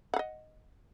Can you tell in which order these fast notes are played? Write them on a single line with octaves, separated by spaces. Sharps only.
F#5 F5 D#5